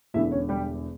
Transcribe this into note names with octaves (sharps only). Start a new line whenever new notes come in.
E1 E2 D3 E4 E5
C#4 C#5
G3 G4